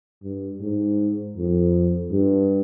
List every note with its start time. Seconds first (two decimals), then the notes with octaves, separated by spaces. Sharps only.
0.24 G2
0.61 G#2
1.37 F2
2.12 G2